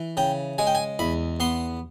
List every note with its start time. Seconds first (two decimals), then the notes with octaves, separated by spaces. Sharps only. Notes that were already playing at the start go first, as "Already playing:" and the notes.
Already playing: E3
0.17 C#3 G5
0.58 G#3 G#5
0.67 G5
0.75 G#5
0.99 E2 B5
1.40 B3 C6